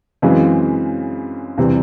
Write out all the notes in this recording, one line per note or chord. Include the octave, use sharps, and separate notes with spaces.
F#2 C#3 E3 G#3 C4
E2 C3 E3 G3 C4